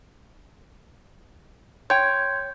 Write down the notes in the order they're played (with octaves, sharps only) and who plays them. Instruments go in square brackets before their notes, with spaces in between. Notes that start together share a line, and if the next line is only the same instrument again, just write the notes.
[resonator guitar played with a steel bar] C#5 G5 [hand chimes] C6 G6 G#6